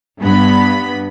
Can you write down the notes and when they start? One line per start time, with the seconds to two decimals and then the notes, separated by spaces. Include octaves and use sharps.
0.21 G2 B3 B5